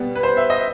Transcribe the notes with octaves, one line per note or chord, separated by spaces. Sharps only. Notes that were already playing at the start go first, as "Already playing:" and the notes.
Already playing: B2 G3 B3
B4
C5
E5
D#5